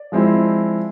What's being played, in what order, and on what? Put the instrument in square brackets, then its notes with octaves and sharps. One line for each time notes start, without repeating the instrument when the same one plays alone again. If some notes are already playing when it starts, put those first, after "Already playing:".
Already playing: [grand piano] D5
F3 G#3 C4 E4